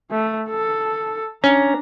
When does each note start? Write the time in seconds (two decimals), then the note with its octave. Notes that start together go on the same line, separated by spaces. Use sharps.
0.11 A3
0.49 A4
1.44 C#4 D4 A#5